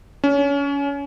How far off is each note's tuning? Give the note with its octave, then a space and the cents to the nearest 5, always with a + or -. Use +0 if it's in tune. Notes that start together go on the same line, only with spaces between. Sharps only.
C#4 +25